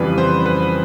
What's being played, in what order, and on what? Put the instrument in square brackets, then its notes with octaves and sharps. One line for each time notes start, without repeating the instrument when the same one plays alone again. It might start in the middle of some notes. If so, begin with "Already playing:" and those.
Already playing: [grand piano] F2 C#3 E3 G3 B4
C5
B4